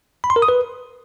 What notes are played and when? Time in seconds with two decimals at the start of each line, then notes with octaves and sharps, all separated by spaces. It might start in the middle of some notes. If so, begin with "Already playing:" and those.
0.24 B5
0.30 C6
0.36 A#4
0.42 D#6
0.49 B4